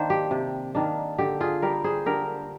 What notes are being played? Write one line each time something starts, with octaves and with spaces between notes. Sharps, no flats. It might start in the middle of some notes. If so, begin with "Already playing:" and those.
Already playing: D#3 A#3 D4 C5
G4
C3
D#3 A#3 D4
D3 G4
F4 G#4
G3 A#3 G4 A#4
G#4 C5
D3 G4 A#4